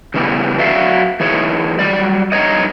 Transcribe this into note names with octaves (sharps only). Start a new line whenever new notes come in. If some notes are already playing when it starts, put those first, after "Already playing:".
C#3 E3 G3 B3
F#3 F#4 D5 E5 F5
E3 D#4 G#4 C#5
F#3 G3 D5
G2 D#4 C5 C#5 D#5